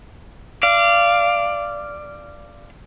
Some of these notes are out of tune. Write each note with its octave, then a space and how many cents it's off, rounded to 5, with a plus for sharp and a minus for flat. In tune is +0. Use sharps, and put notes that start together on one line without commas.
D5 +0 F5 -20